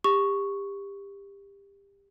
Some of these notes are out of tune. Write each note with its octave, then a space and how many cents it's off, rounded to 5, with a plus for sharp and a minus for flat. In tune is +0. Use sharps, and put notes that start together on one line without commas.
G4 +25 C#6 +0